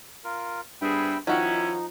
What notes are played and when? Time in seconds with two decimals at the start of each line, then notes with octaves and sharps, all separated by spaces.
0.24 F4 A#4
0.81 G2 B3 C4 G#4 E5 G5 B5
1.27 D#3 F3 C#4 D#4 E4 F#4